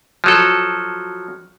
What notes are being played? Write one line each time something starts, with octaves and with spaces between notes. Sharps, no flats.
F3 F#3 A4